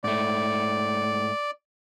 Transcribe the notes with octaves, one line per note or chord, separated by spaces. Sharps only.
G#2 A3 D5